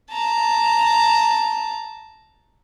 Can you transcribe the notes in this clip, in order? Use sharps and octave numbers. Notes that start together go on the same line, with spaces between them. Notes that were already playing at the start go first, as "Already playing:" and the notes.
A5 A#5